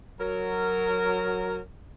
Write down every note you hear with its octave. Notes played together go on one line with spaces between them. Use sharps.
F#3 A#4